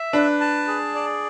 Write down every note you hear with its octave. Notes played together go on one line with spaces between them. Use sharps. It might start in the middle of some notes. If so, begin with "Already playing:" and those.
Already playing: E5
D4 B4
A5
G#4
D5